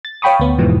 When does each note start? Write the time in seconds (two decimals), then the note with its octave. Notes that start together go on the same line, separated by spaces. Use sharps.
0.05 A6
0.22 C#5 F5 G5 B5 C#6 D#6
0.40 D2 B3
0.58 E2 G#2 B2 E3 F3